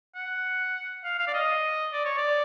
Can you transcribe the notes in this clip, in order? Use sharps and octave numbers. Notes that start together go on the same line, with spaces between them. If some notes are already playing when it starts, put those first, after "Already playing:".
F#5
F5
F5
D5
D#5
D5
C#5
D5